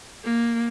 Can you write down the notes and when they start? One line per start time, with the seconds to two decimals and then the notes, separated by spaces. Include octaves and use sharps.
0.25 A#3